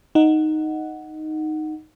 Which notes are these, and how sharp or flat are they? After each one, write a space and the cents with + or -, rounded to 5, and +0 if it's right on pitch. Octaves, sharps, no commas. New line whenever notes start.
D#4 +0 F#5 +0